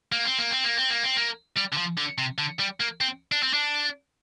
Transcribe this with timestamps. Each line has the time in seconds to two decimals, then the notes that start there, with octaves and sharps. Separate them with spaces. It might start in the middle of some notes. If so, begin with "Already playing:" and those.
0.12 A#3
0.25 C4
0.38 A#3
0.51 C4
0.64 A#3
0.77 C4
0.90 A#3
1.04 C4
1.17 A#3
1.56 G3
1.72 D3
1.77 F3
1.97 D3
2.18 C3
2.38 D3
2.59 G3
2.80 A#3
3.01 C4
3.32 D4
3.43 C4
3.54 D4